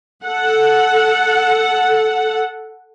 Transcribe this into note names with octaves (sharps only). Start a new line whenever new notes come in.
A4 F#5